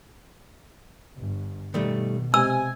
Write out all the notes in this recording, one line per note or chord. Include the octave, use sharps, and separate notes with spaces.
G1
B2 D#3 G3 A3
C3 D#5 G#5 E6